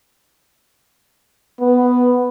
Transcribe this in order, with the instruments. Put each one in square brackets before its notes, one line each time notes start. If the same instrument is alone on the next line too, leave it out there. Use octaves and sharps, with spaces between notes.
[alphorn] B3